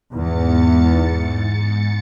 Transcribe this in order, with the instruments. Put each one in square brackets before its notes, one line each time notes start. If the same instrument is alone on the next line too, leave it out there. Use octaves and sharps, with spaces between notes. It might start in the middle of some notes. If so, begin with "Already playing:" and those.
[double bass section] E2 [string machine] G#2 A6 C#7